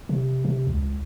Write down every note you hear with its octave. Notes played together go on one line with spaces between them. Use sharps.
C3
C3
C#2